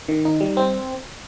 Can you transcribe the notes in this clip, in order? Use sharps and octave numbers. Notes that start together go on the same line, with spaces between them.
D#3
D#4
G3
C4